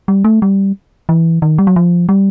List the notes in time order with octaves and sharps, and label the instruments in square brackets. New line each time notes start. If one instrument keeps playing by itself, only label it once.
[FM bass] G3
A3
G3
E3
D#3
G3
F#3
F3
G3